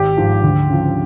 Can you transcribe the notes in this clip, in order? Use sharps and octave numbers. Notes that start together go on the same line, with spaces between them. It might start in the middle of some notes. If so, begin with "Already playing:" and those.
Already playing: G#1 G4
G#2 F3
D2
C#3 F3